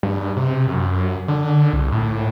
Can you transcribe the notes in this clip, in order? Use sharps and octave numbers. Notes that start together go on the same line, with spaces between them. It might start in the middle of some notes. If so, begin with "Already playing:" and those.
G2
C3
F#2
F#2
D3
C2
A2